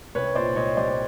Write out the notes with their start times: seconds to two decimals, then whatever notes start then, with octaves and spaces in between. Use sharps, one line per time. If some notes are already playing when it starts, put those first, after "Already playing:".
0.15 C2 B4 C#5
0.35 A#2 C5 D5
0.56 C2 C#5 D#5
0.77 G3 C5 D5